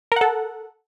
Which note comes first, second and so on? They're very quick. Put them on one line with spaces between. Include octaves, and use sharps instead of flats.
A#4 F#5 A4